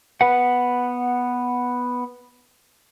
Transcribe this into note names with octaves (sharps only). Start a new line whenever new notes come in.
B3 B4 F#5